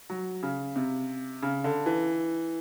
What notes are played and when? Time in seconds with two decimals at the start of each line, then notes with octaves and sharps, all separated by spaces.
0.10 F#3
0.43 C#3
0.76 C3
1.42 C#3
1.64 D3
1.86 E3